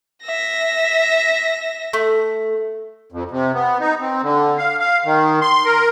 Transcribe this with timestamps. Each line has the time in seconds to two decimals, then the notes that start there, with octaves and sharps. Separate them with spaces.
0.24 E5 A#6
1.93 A3
3.12 F2
3.31 C3
3.54 B3
3.80 D#4
4.00 C4
4.23 D3
4.58 F5
4.80 F5
5.05 D#3
5.42 C6
5.65 A#4